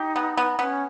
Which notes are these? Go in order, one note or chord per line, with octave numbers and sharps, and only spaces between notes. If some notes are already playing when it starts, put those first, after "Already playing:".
Already playing: D#4 G4
B3
B3
B3 C#4